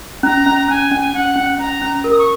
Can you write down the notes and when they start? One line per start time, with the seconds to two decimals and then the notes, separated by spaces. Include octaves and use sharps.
0.23 C#4 A#5
0.46 C#4
0.68 C#4 G#5
0.91 C#4
1.13 C#4 F#5
1.36 C#4
1.58 C#4 A#5
1.82 C#4
2.04 A#4
2.11 D#6
2.19 C#6